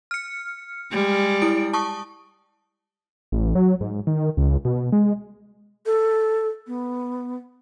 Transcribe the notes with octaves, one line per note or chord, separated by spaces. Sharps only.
F6 C#7
G3 G#3
E4 D7
A5 C#6 D#6
A1
F#3
G#2
D#3
C#2
B2
G#3
A4
B3